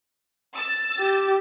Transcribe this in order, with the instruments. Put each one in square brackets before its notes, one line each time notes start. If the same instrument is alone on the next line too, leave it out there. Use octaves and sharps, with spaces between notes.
[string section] E6 A6
[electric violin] G4